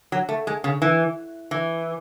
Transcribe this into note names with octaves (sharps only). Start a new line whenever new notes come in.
F#3
A3
G#3
C#3
E3
E3